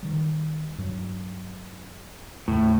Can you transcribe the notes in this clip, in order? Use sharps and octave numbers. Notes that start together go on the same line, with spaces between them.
D#3 G3
G2 F#3
D#2 A2 C#3